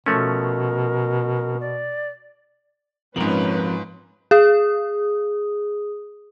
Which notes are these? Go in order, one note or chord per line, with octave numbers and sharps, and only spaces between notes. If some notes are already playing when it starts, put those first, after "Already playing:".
B2 F3 A3 C#4 A#4
D5
G#2 F3 C4 C#4 F4 A#4 B4 F#7
G#4 D#6